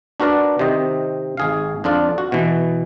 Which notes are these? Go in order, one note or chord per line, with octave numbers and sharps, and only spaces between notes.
D4 F#4 A#4 B4 D5
C3 D#3 C5 D#5
G#1 G#4 F5
F2 D4 F4 D5
F#4
B2 E3